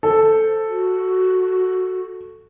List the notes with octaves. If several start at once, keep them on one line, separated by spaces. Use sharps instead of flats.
A4 C5
F#4